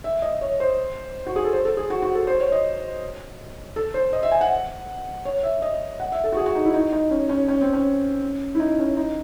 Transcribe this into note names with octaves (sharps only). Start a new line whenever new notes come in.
E5
D#5
C#5
C5
F#4
G#4
A4
C5
A4
G#4
F#4
F#4
A4
C5
C#5
D#5
A4
C5
D#5
E5
G#5
F#5
C#5
E5
D#5
F#5
E5
A4
F#4
G#4
F#4
D#4
E4
D#4
D#4
C#4
C#4
C#4
C4
C#4
E4
D#4
C#4
D#4